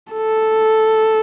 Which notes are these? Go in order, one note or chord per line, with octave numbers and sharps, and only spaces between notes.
A4